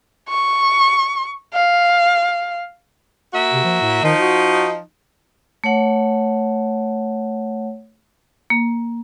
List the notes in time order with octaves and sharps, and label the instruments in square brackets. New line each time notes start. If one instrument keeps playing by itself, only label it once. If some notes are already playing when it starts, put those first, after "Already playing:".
[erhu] C#6
F5
[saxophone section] A#3 F#4 E5
[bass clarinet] C3
F3
A2
[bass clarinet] D#3 [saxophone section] F3 D#4
[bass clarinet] F#4
[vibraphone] A3 C#5 F#5
[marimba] A#3